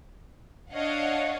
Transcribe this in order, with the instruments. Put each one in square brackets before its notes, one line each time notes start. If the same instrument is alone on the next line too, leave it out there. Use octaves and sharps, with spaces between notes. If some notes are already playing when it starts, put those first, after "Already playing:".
[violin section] D4 C#5 D#5 F5 F#5